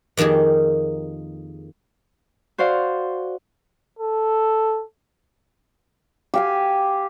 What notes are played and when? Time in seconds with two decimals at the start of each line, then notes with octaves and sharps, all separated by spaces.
0.17 F2 D#3 A#3 G4 G#4
2.58 F#4 C5 D5 F5
3.99 A4
6.34 G4 F5 G#5